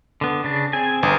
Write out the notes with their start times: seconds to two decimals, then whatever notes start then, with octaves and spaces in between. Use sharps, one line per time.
0.21 D3 B3
0.44 C#3 D4
0.73 C4 G#4 G#5
1.03 G1 D#3 G#4 A#4